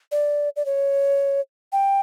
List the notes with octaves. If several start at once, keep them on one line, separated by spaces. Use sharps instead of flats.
D5
D5
C#5
G5